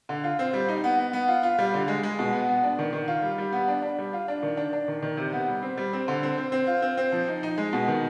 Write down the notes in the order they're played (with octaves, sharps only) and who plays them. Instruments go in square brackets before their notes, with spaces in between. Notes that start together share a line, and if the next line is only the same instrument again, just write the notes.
[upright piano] D3
F4
C4
G3
D#4
B3
B3
B3
F4
F4
G3
D3
G#3
G#3
B2
B3
B3
D4
D#3
D#3
F4
G3
G3
B3
D4
D4
G3
F4
D4
D#3
D4
D4
D#3
D#3
C3
B3
G3
C4
G3
C4
D3
C4
C4
C4
F4
C4
C4
F3
D#4
D#4
G#3
B2
D#3